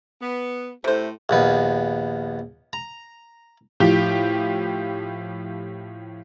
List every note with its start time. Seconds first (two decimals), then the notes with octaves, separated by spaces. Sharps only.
0.20 B3
0.84 A2 C3 A3 C5
1.29 A#1 D#2 B3
2.73 A#5
3.80 A2 F3 G4 G5